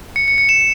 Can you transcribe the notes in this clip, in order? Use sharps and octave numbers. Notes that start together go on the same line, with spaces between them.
C#7
C#7
C#7
E7